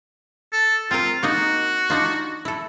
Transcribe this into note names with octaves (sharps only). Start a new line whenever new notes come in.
A4
C4 F4 A#4
A#3 D#4 F#4 D#5
D4 D#4 F4
E4 A4